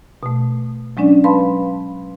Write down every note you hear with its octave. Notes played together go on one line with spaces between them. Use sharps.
B2 A3
F#3 G#3 C#4 D4 D5
B4 F5 A5 B5 C6